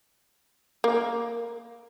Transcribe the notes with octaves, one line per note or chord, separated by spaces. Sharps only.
A#3